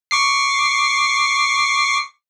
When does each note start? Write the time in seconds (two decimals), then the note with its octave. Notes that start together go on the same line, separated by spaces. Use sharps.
0.11 C#6 D6 C7